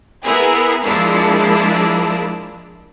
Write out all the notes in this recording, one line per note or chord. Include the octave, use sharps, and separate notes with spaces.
B3 E4 G#4 A#4
F3 G#3 A#3 D4 E4